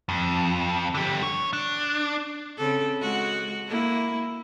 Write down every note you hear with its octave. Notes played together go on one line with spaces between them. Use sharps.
F2
D3 G4
C#5
D4
C#3 C4 A4
G#3 F#4
A#3 E4